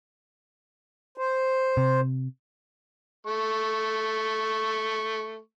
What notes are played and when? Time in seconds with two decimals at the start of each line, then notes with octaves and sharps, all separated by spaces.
1.18 C5
1.77 C3
3.27 A3 C#6